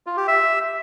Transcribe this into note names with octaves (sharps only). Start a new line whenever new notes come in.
F4
G4
E5